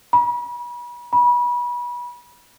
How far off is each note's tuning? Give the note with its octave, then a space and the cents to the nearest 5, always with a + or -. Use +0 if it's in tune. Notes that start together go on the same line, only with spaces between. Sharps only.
B5 -40
B5 -30